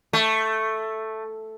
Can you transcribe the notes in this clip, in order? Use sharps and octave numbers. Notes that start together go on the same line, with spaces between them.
A3